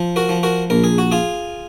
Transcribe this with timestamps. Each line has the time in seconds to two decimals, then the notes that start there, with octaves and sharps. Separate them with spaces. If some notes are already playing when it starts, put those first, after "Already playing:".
Already playing: F3
0.16 F#4 A#4
0.29 F3
0.43 F#4 A#4
0.70 A#1 A#4
0.84 G#4
0.98 F#4
1.12 F4 G#4